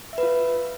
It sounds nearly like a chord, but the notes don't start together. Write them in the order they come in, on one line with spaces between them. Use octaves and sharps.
E5 B4 F4